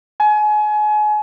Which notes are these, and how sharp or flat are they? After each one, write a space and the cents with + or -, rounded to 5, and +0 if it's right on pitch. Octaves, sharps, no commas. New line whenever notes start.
G#5 +30